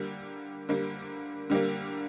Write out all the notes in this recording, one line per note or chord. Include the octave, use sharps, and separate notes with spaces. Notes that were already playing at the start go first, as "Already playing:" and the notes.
Already playing: D3 G3 A#3
D3 G3 A#3
D3 G3 A#3